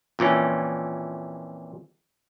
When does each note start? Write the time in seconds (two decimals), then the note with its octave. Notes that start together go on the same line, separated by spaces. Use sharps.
0.19 F2 A#2 E3 C#4